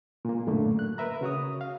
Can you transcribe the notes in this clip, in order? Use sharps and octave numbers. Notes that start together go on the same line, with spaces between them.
A#2 A#3
F#2 A2 D3 A3 A#3
F#6
A#4 B4 E5 A#5
C#3 F#4 C#5 D#6
F5